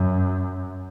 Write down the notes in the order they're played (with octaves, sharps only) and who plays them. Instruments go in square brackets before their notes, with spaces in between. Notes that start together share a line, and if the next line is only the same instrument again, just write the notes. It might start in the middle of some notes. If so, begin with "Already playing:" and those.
Already playing: [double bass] F#2